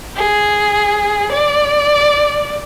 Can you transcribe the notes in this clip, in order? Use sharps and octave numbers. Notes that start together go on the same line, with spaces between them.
G#4
D5